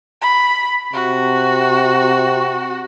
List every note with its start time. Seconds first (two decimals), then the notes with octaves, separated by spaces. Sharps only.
0.21 B5
0.93 C3 F#4